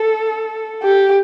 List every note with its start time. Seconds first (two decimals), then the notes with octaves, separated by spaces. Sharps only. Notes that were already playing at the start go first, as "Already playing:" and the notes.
Already playing: A4
0.83 G4